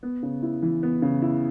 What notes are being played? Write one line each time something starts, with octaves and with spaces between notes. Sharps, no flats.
B3
C#3
E4
E3
B3
C#3
E4